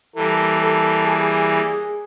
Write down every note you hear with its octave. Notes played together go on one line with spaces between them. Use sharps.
E3 G3 A#3 A4
A4
G#4